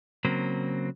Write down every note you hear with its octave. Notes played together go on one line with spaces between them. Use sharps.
C#3 F#3 A#3 C4